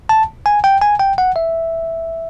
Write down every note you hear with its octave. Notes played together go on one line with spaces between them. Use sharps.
A5
G#5
G5
G#5
G5
F#5
E5